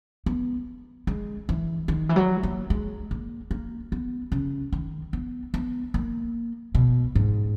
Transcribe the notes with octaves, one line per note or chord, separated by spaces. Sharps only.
B3
G#3
E3
D#3
E3
F#3
A#3
G#3
A#3
A#3
B3
C#3
D#3
B3
B3
A#3
B2
G#2